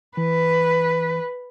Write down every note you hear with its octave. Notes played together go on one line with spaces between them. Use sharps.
E3 B4